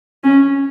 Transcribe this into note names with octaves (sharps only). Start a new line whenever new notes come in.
C#4